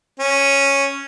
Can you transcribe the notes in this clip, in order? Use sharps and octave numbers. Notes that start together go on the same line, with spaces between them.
C#4